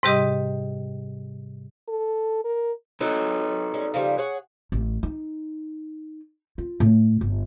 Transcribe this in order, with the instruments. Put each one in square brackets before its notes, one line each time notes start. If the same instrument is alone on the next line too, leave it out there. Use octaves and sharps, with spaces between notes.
[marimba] G#2 C3 G3 G4 D#5 D#6
[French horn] A4
A#4
[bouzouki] F#3 [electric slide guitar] D#4 A4 B4
[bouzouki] G3 G#3 C#4
C#3 F3 G3
G#4 C#5 F#5
[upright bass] A1
D#4
F4
A2
G1